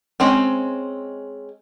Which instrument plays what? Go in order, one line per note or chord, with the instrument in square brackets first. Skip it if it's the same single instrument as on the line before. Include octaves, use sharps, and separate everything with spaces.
[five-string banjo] G#3 C4 C#4